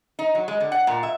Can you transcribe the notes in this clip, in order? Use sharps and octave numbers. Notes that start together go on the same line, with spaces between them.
D#4
F#3
G#3
D3
F#5
A#2
E5